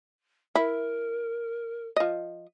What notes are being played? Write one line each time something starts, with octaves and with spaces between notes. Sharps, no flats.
E4 A#4
F3 D#5